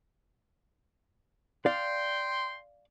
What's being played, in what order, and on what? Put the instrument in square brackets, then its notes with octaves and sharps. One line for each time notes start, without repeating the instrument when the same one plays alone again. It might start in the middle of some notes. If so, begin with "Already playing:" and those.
[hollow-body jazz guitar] D5 F5 [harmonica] G5 C6